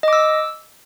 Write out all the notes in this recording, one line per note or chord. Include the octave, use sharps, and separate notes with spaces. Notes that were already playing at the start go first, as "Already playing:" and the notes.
D#5 D6 E6